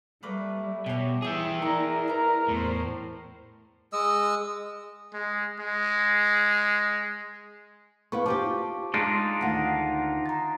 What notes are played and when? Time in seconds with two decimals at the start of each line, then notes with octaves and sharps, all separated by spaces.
0.23 G3 A3 A#3 B4
0.86 B2 G4 C#5
1.22 E3 G#4 E5 G5 D#6
1.62 E4 A#4 D5 A#5
2.08 B4 A#5
2.48 E2 A2 C5
3.93 G#3 D#5 E6
5.14 G#3
5.60 G#3
8.12 B3 E4 B4 F5 C#6
8.26 C4 F4 G4 A5 D6
8.94 G#3 D4 D#4 F4
9.41 D2 D#3 F5 F#5
10.26 A#5 A6